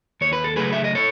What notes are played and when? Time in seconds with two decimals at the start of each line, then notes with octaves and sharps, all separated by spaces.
0.21 D#2 C#5
0.33 B4
0.44 A4
0.56 C#3 F#3 A3 G#4 B4
0.72 E5
0.84 D#5
0.95 A4 C#5